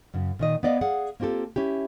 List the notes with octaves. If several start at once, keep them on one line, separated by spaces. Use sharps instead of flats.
F#2 C#3
A#2 D#3 D#5
B3 C5 D5 D#5 F5
G#4 D5 F5 F#5
A#3 C4 F4 G4 A4
C#4 E4 G4